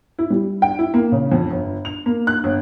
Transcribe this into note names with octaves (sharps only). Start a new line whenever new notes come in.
E4
G3
G5
E4
A#3
C#3
F2
G1
F7
A#3
F#6
G1